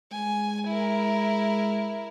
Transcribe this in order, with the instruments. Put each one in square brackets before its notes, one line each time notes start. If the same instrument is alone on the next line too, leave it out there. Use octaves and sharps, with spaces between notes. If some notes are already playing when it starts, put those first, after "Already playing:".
[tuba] G#3 [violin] G#5
[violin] E4 A#4